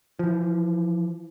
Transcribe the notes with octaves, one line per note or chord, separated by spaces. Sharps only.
E3 F3